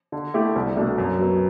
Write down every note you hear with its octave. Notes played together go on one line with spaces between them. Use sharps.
D3
A3 E4 G4
C2
B2 A3 D4
F#2
F#3 B3